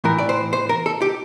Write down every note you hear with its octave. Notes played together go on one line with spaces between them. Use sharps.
A2 E3 A#4
D5
C5
C5
A#4
A4
G4